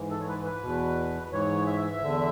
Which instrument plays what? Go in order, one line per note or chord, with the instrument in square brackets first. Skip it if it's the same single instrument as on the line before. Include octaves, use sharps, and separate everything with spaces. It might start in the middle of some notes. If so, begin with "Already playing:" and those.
Already playing: [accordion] G#2 E3
A4
C#5
B4
B4
E2 B2
G#2 E3 C#5
E5
E2 D3